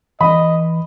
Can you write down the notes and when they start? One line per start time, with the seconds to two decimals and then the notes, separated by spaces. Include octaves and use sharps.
0.21 E3 D#5 B5